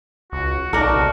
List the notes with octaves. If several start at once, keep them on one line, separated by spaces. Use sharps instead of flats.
C#2 F#4
B1 D4 D#4 F#4 A#4
C3